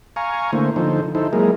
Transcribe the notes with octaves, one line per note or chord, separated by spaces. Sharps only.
F5 G#5 A#5 C#6
D3 A3 A#3 E4 C5
D3 F3 D#4 A4 C5
D#4 E4 A4 C5
F#3 G#3 A#3 E4 G#4 A#4